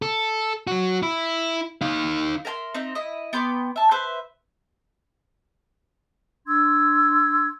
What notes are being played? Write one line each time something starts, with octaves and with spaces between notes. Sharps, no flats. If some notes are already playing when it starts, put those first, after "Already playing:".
A4
F#3 F#4
E4
D#4 F5
A#4 E5 G#5 C6
C4 D#4 E5
E4 D#5
B3 G5 C6 D6
E5 A5
B4 C5 E5 C6
D4 C6 E6 G#6